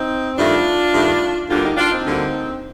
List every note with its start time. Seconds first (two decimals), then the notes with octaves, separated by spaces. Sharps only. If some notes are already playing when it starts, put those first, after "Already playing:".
Already playing: C4 D#4
0.38 G2 D#3 A3 D4 F4
0.94 G2 D#3 A3
1.49 D2 D3 G3 A#3 D4 F4
1.63 D#4 G4
1.77 D4 F4
1.91 C4 D#4
2.05 D2 D3 G3 A#3